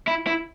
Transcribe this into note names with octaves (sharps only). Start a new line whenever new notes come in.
E4
E4